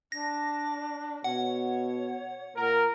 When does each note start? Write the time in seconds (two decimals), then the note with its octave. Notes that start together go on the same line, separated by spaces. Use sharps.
0.12 D4 A#6
1.24 B2 C#5 F#5
2.56 A#2 A#4